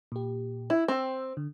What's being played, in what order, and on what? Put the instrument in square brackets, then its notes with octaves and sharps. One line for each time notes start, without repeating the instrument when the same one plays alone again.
[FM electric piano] A#2 G4
[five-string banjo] E4
[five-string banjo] C4 [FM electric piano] G5 E6
[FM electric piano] D3